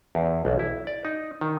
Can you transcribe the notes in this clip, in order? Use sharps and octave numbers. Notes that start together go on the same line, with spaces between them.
E2
B1
E4
D5
D#4
D#3